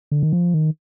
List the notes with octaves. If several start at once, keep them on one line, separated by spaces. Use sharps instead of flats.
D3
D#3
F3
D#3